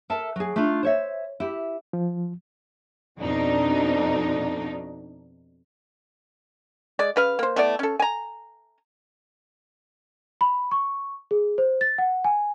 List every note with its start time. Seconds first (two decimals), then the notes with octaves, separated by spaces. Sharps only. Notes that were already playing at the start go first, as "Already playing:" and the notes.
0.10 A4 A#4 E5 A5
0.36 F#3 G#4
0.56 A3 D4 D#4 F4
0.83 C5 C#5 E5
1.40 E4 G4
1.93 F3
3.18 F2 B2 D4 D#4
6.99 G#3 D5
7.16 C#3 B4 F5
7.39 A#3 C5
7.56 A3 B3 E4 D5
7.79 C#4 A4
8.00 G#5 A#5
10.41 B5
10.71 C#6
11.31 G#4
11.58 C5
11.81 A6
11.98 F#5
12.24 G#5